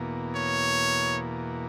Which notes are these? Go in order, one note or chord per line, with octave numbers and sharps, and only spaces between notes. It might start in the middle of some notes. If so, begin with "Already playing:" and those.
Already playing: E2 B2 A#3
C#5